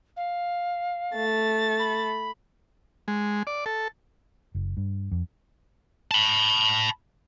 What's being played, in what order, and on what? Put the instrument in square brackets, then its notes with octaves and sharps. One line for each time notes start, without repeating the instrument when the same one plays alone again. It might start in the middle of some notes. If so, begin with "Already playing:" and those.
[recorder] F5
[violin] A3 A6
[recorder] B5
[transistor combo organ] G#3
D5
A4
[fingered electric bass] F#1
G2
F2
[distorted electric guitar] A5 B5